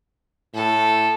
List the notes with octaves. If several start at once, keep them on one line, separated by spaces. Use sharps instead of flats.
A2 A4